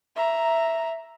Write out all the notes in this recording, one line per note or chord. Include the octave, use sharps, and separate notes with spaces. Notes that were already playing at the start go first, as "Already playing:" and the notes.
E5 A#5